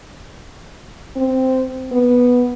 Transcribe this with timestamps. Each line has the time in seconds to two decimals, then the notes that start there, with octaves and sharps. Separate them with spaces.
1.16 C4
1.92 B3